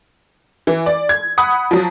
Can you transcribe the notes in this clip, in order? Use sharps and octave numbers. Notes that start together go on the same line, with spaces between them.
E3
D5
G#6
F#5 B5 D#6
F3 F#3